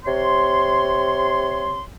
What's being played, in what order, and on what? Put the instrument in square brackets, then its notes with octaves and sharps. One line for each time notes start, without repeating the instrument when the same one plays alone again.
[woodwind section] C3 C#5 C6